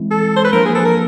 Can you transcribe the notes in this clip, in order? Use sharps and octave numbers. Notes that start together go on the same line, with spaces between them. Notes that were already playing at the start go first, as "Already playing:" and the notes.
Already playing: E3 G#3 C4 E4
A4
C5
B4
F3 A#3 D4 A#4
G#4
A4
A#4